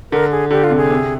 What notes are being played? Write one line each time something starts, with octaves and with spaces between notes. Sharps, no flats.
D3 A#4
G#4
D3 G4
F4
C3
G#4
C3